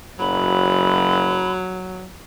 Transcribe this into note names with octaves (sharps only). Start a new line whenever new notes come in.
F#1 F#3 B5